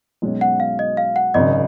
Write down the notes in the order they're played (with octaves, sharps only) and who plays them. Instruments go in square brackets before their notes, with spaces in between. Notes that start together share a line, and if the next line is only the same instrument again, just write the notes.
[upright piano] B1 B2 G#3 C#4
[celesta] F#5
F5
D#5
F5
F#5
[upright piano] G#1 F#2 C#3 [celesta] D#5